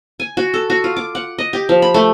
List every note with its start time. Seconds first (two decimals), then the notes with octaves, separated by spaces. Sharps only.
0.20 G#5
0.37 F#4
0.54 A4
0.70 F#4
0.84 F4
0.97 D6
1.15 F#5
1.38 D#5
1.53 G4
1.69 F3
1.82 B5
1.94 A3